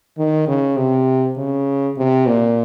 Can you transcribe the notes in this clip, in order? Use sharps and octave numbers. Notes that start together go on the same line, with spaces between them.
D#3
C#3
C3
C#3
C3
A#2